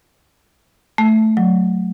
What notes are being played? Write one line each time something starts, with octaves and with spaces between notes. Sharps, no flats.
A3
F#3